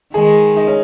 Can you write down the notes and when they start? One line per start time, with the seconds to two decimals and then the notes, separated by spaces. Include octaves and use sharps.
0.14 D#3 G#3 G#4
0.56 D#4
0.67 C#4